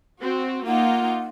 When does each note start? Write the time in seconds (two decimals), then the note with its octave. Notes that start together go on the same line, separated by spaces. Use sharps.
0.20 C4 F#4
0.67 A#3 D#4 F4 F#5